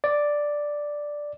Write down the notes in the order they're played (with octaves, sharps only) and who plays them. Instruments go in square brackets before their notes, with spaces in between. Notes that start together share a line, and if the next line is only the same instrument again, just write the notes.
[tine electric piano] D5